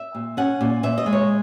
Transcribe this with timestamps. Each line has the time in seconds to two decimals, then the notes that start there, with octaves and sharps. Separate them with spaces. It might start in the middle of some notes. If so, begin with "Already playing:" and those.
Already playing: E5
0.15 A#2
0.37 C#4 F#5
0.61 A#2
0.83 A#2 E5
0.98 D#5
1.06 G#3
1.13 C#5